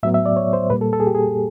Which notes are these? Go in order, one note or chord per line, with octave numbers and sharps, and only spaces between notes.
A2 F#3 B3 E5
E5
D5
C#5
C5
A#2 G3 A#3 B4
A4
A4
G#4
G4
G#4